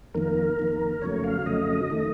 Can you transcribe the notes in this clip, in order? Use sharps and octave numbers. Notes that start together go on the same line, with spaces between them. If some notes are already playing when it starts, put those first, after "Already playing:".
F2 D#3 A#3 A#4
F2 D#3 A#3
F2 C#3 F#3 A3 C#5
F5
F2 C#3 F#3 A3 D#5
D#3 A3